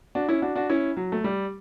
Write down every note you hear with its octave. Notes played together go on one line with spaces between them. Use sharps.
D4 F#4
C#4 E4
D4 F#4
D4 F#4
C#4 E4
F#3
A3
G3